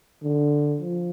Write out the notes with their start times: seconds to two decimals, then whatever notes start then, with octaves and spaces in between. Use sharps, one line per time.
0.22 D3
0.80 F3